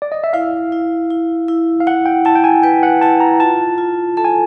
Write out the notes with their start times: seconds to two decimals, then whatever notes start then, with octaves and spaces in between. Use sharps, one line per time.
0.02 D5
0.12 D#5
0.24 E5
0.33 E4 F5
0.72 E4
1.10 E4
1.48 E4
1.80 F5
1.87 E4 F#5
2.06 G5
2.25 E4 A5
2.35 G5
2.44 G#5
2.63 B4 G5
2.83 F#5
3.01 E4 A5
3.20 A#5
3.40 F4 A5
3.78 F4
4.17 A4 A5
4.24 G#5